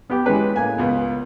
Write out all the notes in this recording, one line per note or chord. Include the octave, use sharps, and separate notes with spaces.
B3 G4
E3 G#3 C#4 B4
A2 A#3 G#5
C#2 B3